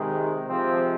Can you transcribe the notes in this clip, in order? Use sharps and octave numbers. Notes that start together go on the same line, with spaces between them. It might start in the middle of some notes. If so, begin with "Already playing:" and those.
Already playing: C3 D#3 G#3
C3 F3 G#3 C4